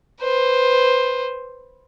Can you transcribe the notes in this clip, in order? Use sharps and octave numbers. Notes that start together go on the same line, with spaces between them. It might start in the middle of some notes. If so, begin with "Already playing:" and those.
B4 C5